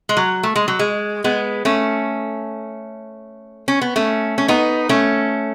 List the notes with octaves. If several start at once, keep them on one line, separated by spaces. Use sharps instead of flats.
G#3
F#3
A3
G#3
F#3
G#3
G#3 B3
A3 C#4
C#4
B3
A3 C#4
C#4
B3 D#4
A3 C#4